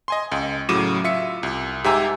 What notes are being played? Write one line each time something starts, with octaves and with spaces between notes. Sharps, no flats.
D#5 G#5 C6
C#2
A2 C#3 F#3 D6 D#7 E7
F4 E5 E6 C#7
C2
G#2 G4 E5 G#5 A#5 E6